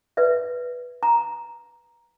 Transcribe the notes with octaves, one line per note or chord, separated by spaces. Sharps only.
B4 D5 E5
A#5